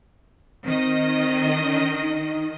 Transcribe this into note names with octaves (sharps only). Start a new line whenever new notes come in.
D#3 C4 D#5
C#4
D#4